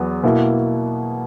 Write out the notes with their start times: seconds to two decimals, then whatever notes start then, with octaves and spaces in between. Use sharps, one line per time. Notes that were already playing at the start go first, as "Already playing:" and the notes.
Already playing: E2 F#3 B3
0.23 B2 A#3 E4